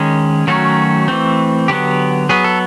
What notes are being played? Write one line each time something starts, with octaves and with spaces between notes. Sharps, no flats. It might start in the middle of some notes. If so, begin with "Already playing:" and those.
Already playing: D#3 G#3 C#4
D#3 F#3 A3 C#4 F#4
E3 A3 C4
D3 F#3 B3 G4
F#3 B3 G#4
A4